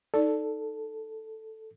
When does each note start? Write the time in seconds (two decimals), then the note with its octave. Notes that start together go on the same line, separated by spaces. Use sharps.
0.14 D#4 A4 D5